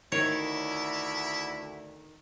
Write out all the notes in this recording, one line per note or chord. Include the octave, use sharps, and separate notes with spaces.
D2 D#3 E4 C#5